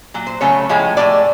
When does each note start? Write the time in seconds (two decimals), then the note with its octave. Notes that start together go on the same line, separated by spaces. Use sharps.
0.14 A#2 F#3
0.27 C5
0.41 C#3 F#3 A3 C#5
0.69 A2 F3 G#3
0.97 A2 F#3 A3 D5